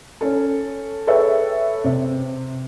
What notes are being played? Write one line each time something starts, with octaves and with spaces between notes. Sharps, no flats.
C#4 A4
G#4 A4 B4 C#5 E5 G5
C3